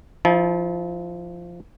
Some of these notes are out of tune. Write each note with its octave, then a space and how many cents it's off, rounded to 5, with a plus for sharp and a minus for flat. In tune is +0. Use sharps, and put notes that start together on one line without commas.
F3 -10 E4 -45 A5 -25